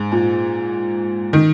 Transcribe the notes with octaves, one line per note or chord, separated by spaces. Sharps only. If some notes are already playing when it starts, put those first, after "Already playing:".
Already playing: G#2
A#2
D#3